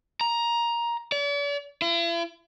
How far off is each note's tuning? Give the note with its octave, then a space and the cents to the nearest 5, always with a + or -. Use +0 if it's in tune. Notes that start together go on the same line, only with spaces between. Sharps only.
A#5 +10
D5 -45
E4 +45